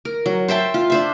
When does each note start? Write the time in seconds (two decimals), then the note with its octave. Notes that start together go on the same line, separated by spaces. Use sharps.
0.05 A#4
0.26 F#3
0.48 C5 E5 G5 A5
0.74 F4
0.90 D4 C5 E5